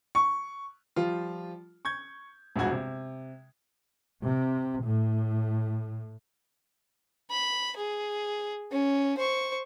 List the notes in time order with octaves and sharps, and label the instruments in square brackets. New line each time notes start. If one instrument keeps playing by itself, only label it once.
[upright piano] C#6
[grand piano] F3 G3 F4
C#6 G6 G#6
E1 A#1 G2 F#4 G#6
C3
[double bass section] C3
A2
[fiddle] B5
G#4
C#4
C5 C#6